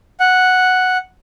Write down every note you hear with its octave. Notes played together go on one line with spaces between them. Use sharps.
F#5